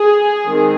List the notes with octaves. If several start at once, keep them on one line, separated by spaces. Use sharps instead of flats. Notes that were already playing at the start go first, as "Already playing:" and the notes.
Already playing: G#4
D#3 G#3 C4